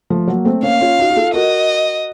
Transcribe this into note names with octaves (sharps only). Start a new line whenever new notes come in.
F3 A3
F#3 A#3
A3 C4
A#3 C#4 F5
C#4 F4
D#4 F#4
F#4
F4 A4
F#4 A#4 D#5